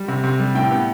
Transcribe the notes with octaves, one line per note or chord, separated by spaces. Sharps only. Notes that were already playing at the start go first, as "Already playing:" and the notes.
Already playing: G3
C3
C3
G3
A2 G5
B3